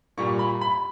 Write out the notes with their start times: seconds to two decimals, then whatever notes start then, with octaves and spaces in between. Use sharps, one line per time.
0.17 A#2 G3 A#3 C#6
0.39 B5
0.61 B5